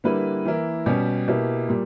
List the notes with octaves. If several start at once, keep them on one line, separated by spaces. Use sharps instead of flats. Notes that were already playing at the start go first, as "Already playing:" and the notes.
D3 G3 A#3 E4 B4
E3 A#3 E4 A#4
B2 G3 C#4 G4
B2 A#3 E4 G4
A#2 G3